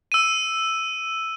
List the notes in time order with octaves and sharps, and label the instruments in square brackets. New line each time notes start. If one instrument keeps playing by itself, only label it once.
[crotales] E6 D#7